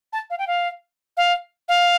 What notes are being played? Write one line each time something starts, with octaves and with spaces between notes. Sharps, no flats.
A5
F5
G5
F5
F5
F5